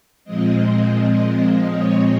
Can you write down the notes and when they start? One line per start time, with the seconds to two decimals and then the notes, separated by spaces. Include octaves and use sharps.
0.24 A#2 F3 G#3 C4 D#5
0.60 D#5
0.97 D#5
1.69 C#5